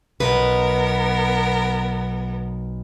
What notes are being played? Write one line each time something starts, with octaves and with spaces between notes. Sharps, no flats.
B1 B3 A#4 B4